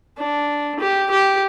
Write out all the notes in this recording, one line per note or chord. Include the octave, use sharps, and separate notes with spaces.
D4
G4
G4